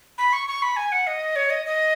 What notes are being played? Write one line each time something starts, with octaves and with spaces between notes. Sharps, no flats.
B5
C#6
C#6
B5
G#5
F#5
D#5
C#5
D#5
D#5